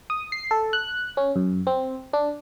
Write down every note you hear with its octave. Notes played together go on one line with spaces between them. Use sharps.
D#6
C7
A4
F#6
C#4
F#2
C4
D4